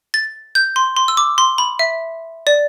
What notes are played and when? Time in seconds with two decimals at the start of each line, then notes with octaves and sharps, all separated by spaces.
0.14 A6
0.55 G6
0.76 C6
0.97 C6
1.08 E6
1.17 D6
1.38 C6
1.58 B5
1.79 E5
2.47 D5